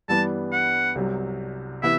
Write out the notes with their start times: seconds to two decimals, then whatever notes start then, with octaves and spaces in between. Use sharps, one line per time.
0.08 G2 E3 G3 B3 D4 A5
0.52 F#5
0.95 C2 C3 F#3
1.83 C3 E3 B3 E4 E5